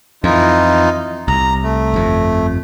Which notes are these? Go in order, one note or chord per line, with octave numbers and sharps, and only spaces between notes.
F2 E3 D#4 F4
C2 A#5
A3
G1 F2